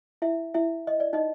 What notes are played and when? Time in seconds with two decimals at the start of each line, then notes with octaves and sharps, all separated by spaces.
0.22 E4 E5
0.54 E4 E5
0.87 D#5
1.00 D5
1.13 D#4 D#5